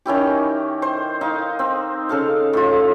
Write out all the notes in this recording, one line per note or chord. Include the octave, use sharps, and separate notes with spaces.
D#3 C#4 E4 G4
C5
D#4 F5
C4
C#3 A4 F5
A2 F4